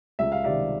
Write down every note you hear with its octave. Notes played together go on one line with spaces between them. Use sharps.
C#2 E5
F5
C3 D#3 D5 E5